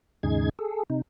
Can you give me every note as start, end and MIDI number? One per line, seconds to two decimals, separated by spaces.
0.23 0.49 39
0.23 0.49 44
0.23 0.49 49
0.23 0.49 63
0.23 0.49 68
0.23 0.49 92
0.59 0.83 68
0.59 0.83 69
0.90 1.02 48
0.90 1.02 63